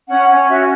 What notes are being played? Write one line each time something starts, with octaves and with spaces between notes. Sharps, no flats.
C#4 F#5
C#4
F#4 E5